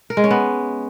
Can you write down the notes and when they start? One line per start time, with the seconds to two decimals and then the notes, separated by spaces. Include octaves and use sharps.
0.10 A#4
0.17 G#3
0.24 C#4
0.31 B3